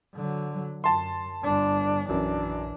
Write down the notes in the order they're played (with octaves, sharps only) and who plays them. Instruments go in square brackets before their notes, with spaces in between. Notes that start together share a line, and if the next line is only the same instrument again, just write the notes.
[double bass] D3 F#3
[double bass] F#2 [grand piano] A5 C6
[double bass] G1 D4
[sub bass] A#1 [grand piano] F#2 [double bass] E3 D4